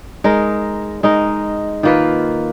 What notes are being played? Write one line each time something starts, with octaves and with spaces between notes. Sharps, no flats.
G#3 D#4 A#4
G#3 D#4 A#4
D#3 A#3 F4 B4